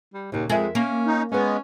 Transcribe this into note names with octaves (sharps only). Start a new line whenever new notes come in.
G3
D#2 A#2 C#3
F2 G#3 A#4 E5
A#3 C#4
D#4
G#3 B3 C#4 B4 D#5